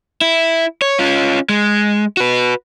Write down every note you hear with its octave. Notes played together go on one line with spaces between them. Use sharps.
E4
C#5
C#4 F4
G#3
F#4 B4